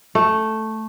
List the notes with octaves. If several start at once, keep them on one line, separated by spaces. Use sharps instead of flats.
A3